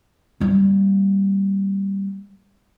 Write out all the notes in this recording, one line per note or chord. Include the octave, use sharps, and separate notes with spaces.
G3 A#3